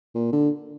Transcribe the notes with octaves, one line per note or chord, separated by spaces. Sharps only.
A#2
D3